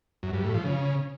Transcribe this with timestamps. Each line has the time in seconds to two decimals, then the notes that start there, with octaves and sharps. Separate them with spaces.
0.23 F#2
0.33 G2
0.44 A2
0.54 F3
0.65 C#3